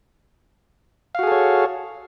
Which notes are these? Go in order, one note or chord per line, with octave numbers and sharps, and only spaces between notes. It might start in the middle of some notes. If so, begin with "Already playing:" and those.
F#4 G#4 A4 C#5 F5